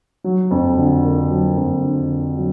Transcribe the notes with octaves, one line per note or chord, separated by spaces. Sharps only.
F#3
F2
D3
A#3
F#3
F2
D3
A#3
F#3